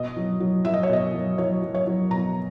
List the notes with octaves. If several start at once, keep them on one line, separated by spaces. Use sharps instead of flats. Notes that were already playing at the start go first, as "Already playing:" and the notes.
Already playing: B2 D#5
F#3
F#3
F#3 E5
D#5
C#5
B2 D#5
F#3
F#3 C#5
F#3
C#5
F#3
B2 A#5